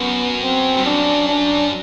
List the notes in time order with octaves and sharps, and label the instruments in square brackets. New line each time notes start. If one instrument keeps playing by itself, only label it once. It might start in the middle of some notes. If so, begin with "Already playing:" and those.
Already playing: [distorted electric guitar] F#2 [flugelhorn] B3
[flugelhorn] C4
[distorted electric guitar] G2
[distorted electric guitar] F#2 [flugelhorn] D4
[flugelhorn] D4